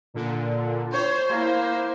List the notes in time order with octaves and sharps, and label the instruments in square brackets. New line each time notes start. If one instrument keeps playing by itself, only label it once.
[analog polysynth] A#2 D3
[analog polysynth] C5 [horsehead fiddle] C#5
[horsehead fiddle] A#3 E4